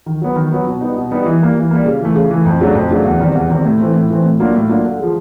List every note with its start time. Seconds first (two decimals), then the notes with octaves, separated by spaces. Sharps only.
0.06 D#3
0.22 F#3 B3
0.36 D#3
0.51 F#3 B3
0.67 B2
0.81 G3 B3 D#4
0.96 B2
1.11 G3 B3 D#4
1.26 E3
1.41 G3 A#3
1.56 E3
1.71 G3 A#3
1.85 C#3
2.00 E3 A3
2.15 C#3
2.31 E3 A3
2.46 F2
2.60 C#3 F#3 A3 D4
2.75 F2
2.91 C#3 F#3 A3 D4
3.05 E2
3.20 C3 D#3 G3
3.35 E2
3.50 C3 D#3 G3
3.65 A2
3.79 E3 A3 C4
3.94 A2
4.10 E3 A3 C4
4.25 A2
4.39 F#3 A#3 D4 F4
4.55 A2
4.69 F#3 A#3 D4 F4
4.84 D3
4.99 F3 G#3